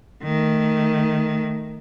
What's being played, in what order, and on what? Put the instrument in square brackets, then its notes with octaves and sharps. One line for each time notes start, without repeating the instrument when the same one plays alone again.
[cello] D#3 A3